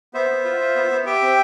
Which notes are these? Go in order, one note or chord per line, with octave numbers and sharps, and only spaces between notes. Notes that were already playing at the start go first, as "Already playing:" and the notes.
B3 C5 E5
B3
F4
F4
B3
B3
G4 E5 G5
C4